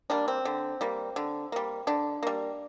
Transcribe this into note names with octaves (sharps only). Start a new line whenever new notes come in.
G3 A#3 D4
C4
D3
G3 A#3
D3
G3 A#3
D3 D4
G3 A#3